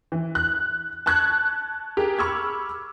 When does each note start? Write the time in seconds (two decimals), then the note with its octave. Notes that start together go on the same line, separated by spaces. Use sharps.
0.12 E3
0.35 F#6
1.06 A5 C#6 F#6 G#6
1.97 G4 G#4 A#4
2.19 B5 C#6 D6 E6 F6 G#6